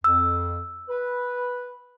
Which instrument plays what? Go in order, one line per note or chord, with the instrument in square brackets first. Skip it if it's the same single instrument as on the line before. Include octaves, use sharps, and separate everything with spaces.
[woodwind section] F2 [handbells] E6
[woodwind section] B4